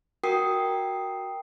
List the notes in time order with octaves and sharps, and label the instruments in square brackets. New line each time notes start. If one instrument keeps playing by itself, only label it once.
[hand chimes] F#4 A#4 G5 D#6 C7